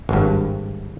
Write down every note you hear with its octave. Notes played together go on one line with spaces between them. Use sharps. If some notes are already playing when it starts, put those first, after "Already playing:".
G#1 G2